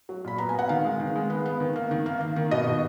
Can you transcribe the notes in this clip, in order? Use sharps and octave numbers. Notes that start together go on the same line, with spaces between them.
F#3
A#2 B5
B3 A#5
G#5
B3 F#5
D#3 F5
G#3
D#3
G#3
B3
B3
D#3
A#3
D#3
A#3
A#3
D#3
B2 D#5
B2